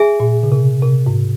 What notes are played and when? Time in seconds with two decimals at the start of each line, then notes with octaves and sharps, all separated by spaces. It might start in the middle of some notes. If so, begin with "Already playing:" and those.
Already playing: G#4 E5 G#5
0.20 A#2
0.43 C#3
0.52 C3
0.82 C3
1.06 G#2